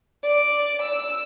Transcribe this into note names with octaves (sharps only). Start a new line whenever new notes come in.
D5
E6